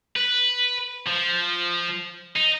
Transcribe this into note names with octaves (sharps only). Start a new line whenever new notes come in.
B4
F3
D#4